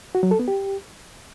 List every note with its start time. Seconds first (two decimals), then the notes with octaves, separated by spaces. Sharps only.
0.15 F#4
0.23 F#3
0.31 A4
0.39 B3
0.48 G4